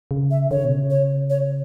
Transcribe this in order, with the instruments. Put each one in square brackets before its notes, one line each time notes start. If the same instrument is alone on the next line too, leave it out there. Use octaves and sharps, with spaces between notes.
[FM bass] C#3
[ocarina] E5
[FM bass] D3 [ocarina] C#5
[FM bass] C#3
B2
C#3
[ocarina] C#5
C#5